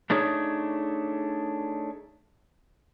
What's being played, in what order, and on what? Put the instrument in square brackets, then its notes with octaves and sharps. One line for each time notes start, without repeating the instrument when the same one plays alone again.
[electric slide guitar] A3 D4 D#4 G#4 C#5